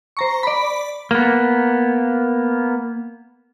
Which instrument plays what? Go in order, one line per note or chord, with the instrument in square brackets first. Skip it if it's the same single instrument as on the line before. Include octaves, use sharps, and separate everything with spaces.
[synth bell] C5 A#5 C#6
D5 B5
[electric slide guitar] A#3 B3